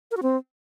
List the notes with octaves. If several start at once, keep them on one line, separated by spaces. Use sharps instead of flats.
A#4
F#4
C4